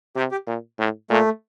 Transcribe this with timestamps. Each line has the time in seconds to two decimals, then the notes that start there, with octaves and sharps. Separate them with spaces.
0.16 C3 G4
0.31 G4
0.47 A#2
0.79 A2
1.10 A#2 A3